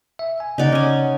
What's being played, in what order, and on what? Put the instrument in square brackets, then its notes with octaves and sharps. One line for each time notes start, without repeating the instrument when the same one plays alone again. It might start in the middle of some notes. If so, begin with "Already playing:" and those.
[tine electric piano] E5
G#5
[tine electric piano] C#3 F#5 [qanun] D#4 D5
[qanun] C#4 G#5